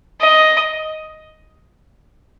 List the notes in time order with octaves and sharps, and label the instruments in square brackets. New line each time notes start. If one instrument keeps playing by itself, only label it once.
[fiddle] D#5